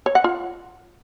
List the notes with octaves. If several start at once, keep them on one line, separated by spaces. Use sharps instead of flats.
C#5
F#5
F4